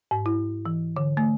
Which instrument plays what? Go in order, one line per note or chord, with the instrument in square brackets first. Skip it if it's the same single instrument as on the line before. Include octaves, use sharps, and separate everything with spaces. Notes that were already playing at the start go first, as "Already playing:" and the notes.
[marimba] G#2
E4
E3
D3
A3